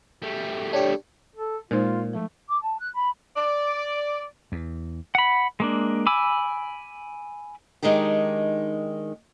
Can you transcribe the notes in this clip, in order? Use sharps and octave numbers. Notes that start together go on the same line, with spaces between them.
G3 A3
D4 G4 C#5
A4
A#2 G#3 D#4 F4 C5
F3 A3
D6
A5
F#6
B5
D5
E2
F#5 B5
G#3 A#3 D4
G#5 B5 D6 E6
D#3 G#3 D4 D#4 G4